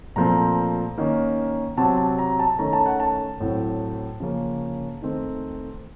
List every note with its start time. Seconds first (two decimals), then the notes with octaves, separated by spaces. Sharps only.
0.16 A#2 F3 A3 C4 A#5
0.98 D#3 A#3 C#4
1.77 C3 F#3 C4 A5
1.98 A5
2.19 A#5
2.39 A5
2.59 D#3 A3 C#4 A#5
2.73 A5
2.86 F#5
3.00 A5
3.40 A2 F#3 C4
4.20 C#3 F3 A#3 C#4
5.02 D#3 A3 C4